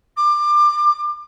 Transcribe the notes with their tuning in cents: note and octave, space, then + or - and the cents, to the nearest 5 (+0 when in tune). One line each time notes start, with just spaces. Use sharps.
D6 +25